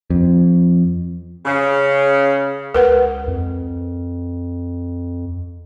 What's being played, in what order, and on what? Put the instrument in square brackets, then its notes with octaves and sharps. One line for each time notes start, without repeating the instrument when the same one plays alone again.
[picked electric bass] F2
[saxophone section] C#3
[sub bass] C#2 [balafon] A#4 B4 F#5
[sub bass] F2